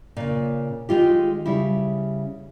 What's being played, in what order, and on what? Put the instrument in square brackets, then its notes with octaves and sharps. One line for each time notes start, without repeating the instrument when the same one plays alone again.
[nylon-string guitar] A#2 C#3
D#3 G#3 F4 G4
C#3 G3 E4